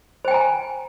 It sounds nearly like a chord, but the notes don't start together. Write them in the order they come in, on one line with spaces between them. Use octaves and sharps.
C5 G5 G#5 A#5